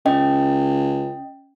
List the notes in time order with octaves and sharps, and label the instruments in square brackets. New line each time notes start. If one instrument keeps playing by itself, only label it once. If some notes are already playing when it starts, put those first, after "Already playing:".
[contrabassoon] C#2 [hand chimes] C#4 D#5 G5